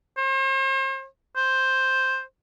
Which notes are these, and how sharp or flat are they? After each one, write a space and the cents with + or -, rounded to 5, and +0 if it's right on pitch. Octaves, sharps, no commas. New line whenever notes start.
C5 +40
C5 +5